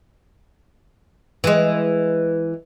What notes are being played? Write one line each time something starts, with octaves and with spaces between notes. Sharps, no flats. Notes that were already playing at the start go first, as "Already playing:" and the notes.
E3 G#3